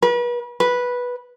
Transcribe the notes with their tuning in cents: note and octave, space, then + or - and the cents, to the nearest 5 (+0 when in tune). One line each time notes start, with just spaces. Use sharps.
B4 -40
B4 -10